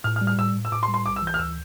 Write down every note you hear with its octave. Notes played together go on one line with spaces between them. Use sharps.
A2 F6
F6
G3
F6
A2 E6
A2
E6
A2 D6
C6
G3
C6
B1 D6
E6
E3
G6
F6
D2 E6